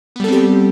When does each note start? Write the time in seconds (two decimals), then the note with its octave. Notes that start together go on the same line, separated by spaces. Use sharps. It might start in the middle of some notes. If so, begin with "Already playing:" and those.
0.16 B3
0.20 G3
0.24 A4
0.28 C4
0.32 G4